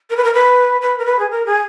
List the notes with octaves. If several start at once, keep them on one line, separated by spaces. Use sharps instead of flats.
A#4
B4
A#4
B4
B4
A#4
B4
G#4
A#4
G#4